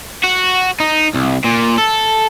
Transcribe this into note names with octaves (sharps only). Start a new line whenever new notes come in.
F#4
D#4
C2
A#2
A4